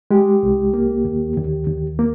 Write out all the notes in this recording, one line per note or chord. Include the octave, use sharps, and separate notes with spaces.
G#3 G4
C2
A#3
D#2
D#2
D#2
A#3